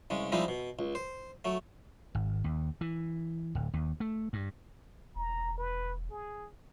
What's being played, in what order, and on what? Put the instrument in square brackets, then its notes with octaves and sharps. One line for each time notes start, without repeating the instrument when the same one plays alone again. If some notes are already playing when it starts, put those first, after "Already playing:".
[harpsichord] C2 C#3 G#3
F3 G3 G#3 C4 D#4 E4
B2
C#2
C5
F#3 A3
[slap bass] G#1
D#2
E3
D1
D#2
A3
G2
[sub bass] E1 [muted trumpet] A#5
[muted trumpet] B4
G#4